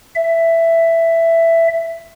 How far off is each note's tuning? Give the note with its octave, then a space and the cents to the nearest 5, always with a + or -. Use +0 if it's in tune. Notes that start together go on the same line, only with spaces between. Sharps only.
E5 +10